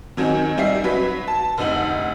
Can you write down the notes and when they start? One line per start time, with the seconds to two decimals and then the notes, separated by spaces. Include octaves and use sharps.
0.17 D#3 F#3 C4 C#4 D#4
0.58 G3 D#4 E5 C7
0.84 F#3 B4 B6
1.28 A5
1.57 F1 D2 D#4 F#7